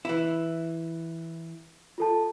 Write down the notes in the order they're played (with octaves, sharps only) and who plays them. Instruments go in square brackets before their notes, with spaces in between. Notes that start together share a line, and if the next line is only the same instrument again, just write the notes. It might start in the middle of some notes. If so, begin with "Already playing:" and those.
[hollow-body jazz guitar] E3 E4
[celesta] F4 A4 A5